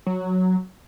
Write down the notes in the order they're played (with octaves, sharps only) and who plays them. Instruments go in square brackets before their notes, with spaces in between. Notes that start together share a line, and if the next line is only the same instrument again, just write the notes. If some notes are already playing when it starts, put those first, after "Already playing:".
[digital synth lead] F#3